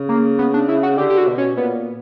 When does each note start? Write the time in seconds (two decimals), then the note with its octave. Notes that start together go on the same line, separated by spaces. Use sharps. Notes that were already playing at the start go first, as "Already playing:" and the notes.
Already playing: C#3
0.09 A#3
0.39 B3
0.54 D4
0.68 E4
0.83 F#4
0.98 D3 G4
1.10 G4
1.18 F#4
1.28 B2
1.38 C#4
1.57 A#2 B3